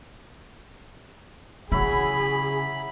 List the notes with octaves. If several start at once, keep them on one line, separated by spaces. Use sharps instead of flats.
C#3 F#3 E4 G#4 B5